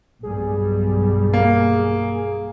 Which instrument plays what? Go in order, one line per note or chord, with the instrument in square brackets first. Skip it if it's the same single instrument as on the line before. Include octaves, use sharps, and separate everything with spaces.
[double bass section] B1 G2 G3 [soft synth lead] G#4
[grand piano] A#3